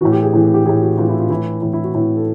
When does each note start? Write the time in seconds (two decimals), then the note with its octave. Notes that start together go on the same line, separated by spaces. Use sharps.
0.01 A2 E3 F#4
0.12 G4
0.23 G#4
0.33 A2 E3
0.54 G4
0.66 E3 G#4
0.69 A2
0.82 F#4
0.97 A2 E3 F4
1.09 E4
1.20 F4
1.30 A2 E3 E4
1.62 A2 E3 E4
1.73 E4
1.84 F#4
1.95 A2 E3
2.17 A4